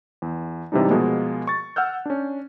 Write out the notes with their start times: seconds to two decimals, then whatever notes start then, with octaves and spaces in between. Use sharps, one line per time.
0.22 E2
0.72 G#2 C3 E3 G3 D4 D#4
0.90 B2 F3 G#3 A#3 B3
1.47 C#6 A6
1.76 F#5 E6 F6 G6
2.06 C#4 D4